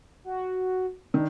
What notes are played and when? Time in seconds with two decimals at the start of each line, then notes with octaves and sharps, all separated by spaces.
0.24 F#4
1.14 D#3 D4